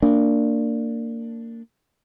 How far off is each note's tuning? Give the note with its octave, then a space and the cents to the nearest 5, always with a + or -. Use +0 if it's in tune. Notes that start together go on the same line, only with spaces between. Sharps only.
A#3 -25 D4 +0